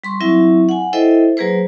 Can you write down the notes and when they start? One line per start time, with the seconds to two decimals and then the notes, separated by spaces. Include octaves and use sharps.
0.04 G3 C6 C#6
0.20 F#3 C4 E4 E5 C#6
0.69 F#5 G#5
0.93 E4 A4 C5 D#5 E5 G5
1.37 F#3 A#3 G#4 B4 C5